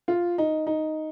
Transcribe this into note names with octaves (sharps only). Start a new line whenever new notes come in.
F4
D#4
D#4